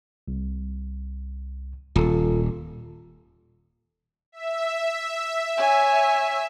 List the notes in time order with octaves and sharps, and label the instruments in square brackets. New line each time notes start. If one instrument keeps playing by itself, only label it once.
[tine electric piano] C2
[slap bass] D#1 [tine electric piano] F4 A4
[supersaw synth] E5
[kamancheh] C#5 G#5